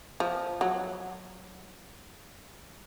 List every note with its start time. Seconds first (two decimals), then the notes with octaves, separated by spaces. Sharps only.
0.20 F3
0.61 F#3